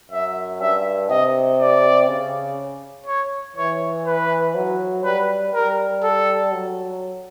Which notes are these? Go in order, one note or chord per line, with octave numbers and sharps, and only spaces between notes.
F#2 E5
G2 E5
C3 D#5
D5
C#3
C#5
E3 C#5
B4
F#3
G3 B4
G3 A#4
A4
F#3